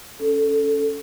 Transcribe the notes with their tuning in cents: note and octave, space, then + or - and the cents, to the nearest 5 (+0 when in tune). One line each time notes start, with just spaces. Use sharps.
C#4 +15 A4 +0